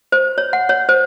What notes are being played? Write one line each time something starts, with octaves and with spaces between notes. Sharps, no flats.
C5
C#5
F#5
C#5
C5